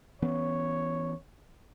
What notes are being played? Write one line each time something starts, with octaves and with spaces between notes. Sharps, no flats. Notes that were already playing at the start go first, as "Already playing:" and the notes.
E3 B3 C#4 C#5